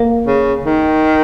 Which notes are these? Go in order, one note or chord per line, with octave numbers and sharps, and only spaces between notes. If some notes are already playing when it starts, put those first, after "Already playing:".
Already playing: A#3
C#3
D#3